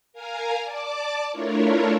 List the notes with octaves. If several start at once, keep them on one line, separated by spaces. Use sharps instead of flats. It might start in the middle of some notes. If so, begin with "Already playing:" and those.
A#4 F5 G#5 A#5
D5 A5 D6
A3 D4 E4 F4 A#4 C#5